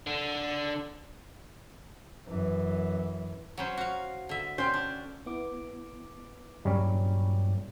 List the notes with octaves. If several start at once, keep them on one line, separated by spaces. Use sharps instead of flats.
D3
F#2 E3
F#3 C#4 C5
F#4 F5
D3 E5
C#4 C5 G5
D4
B3 E4 D6
G2 A#2 F#3 G3 C#4